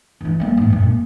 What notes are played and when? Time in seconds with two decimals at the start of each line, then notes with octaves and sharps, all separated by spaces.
0.21 E3 E4
0.40 G3 A#3
0.57 G#2 E3
0.70 F#2 A#2
0.83 A#3